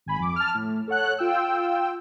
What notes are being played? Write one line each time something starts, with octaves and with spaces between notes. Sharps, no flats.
G#1 G#5 B5
F2 D6
A5 F6
A2
A4 C#5 F#5 F#6
F4 G5 E6